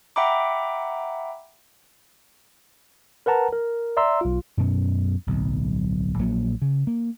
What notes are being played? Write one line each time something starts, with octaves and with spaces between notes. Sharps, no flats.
E5 F#5 G5 A#5 B5 D6
A#4 B4 F#5 A5 A#5
A#4
D5 E5 A#5 C6 E6
B1 F4
F#2 B2 C#4
D1 B1
A#1 A#2 F#3
C#3
A#3